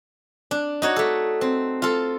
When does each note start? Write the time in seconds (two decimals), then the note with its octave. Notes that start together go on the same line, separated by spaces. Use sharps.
0.51 D4
0.82 D#4 F#4 C#5
0.96 A3 A4
1.41 C4
1.82 F4 A4